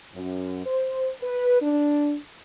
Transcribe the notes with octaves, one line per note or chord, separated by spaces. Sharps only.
F#2
C5
B4
D4